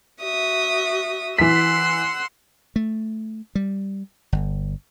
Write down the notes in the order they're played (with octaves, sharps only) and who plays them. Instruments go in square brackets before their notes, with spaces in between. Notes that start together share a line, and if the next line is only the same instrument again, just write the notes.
[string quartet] F#4 E5 D#6
[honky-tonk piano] E3 B6 [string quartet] F#5 C6 E6
[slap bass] A3
G3
G1